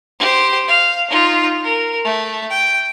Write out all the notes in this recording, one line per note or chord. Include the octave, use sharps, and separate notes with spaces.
G4 C5
F5
D#4 F4
A#4
A3
G5